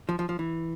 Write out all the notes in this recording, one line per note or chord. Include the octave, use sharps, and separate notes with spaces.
F3
F3
F3
E3